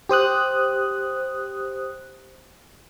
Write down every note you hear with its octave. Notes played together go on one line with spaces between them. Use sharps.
G4 C5 D#6 F#6